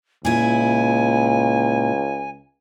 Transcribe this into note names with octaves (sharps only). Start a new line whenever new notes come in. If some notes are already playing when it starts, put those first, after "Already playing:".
C#2 A#2 E4 G#5